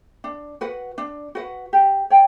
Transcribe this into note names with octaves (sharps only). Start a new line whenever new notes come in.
D4
F#4 B4 F#5
D4
F#4 B4 F#5
G4
C#5 G5